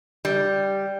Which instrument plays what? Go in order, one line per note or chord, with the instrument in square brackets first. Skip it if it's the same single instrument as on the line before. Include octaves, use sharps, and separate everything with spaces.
[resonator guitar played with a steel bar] G3